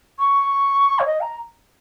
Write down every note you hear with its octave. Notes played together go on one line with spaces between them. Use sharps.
C#6
C#5
D#5
A#5